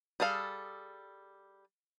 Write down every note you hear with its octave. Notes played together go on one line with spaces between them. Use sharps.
G3 G#4 A4 F5